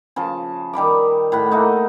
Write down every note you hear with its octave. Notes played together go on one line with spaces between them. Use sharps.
C#3 F3 A5
D#3 G3 B5 D6
A2 F#5 B5
A3 A#3 D#4 F#4